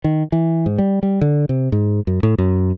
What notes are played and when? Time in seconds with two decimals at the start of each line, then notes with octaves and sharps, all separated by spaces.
0.04 D#3
0.32 E3
0.66 G#2
0.78 G3
1.03 G3
1.21 D3
1.49 C3
1.72 G#2
2.07 F#2
2.23 A2
2.38 F#2